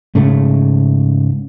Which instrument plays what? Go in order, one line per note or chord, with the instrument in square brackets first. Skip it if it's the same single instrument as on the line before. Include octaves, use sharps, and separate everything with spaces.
[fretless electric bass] G#2 C#3 A3